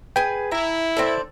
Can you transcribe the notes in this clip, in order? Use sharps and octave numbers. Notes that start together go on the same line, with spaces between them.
G#4 B4 G5
E4 A#5
C4 D4 A4